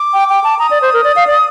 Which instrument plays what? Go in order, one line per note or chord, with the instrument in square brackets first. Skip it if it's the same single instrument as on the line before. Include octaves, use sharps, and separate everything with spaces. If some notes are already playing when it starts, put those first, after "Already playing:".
Already playing: [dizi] D6
[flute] G5
G5
A5
[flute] A#5 [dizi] D#6
[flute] D5
C5
A#4
D5
F5
D5